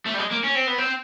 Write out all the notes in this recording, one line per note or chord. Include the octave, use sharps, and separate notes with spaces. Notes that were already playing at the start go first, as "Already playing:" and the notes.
A3
G3
G#3
A#3
C#4
C4
B3
C4